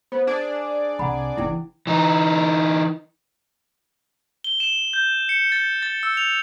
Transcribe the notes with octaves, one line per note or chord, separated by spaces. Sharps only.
B3 C5
D4 G#4 D5
C2 F#5 A#5 B5
F#1 E3 E4 G5
E3 D#4
G7
E7
G6
C#7
A6
A6
E6
F7